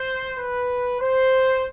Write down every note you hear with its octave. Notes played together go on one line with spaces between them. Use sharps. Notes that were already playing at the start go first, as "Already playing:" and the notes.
Already playing: C5
B4
C5